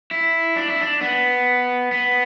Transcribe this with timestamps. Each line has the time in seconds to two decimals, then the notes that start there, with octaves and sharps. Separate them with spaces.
0.11 E4
0.56 D4
0.68 E4
0.81 D4
1.01 B3
1.92 B3